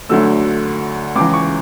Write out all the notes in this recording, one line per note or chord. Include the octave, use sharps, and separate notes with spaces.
D2 D3 F#3 A3 E6
C#2 C#3 E3 D6
C#6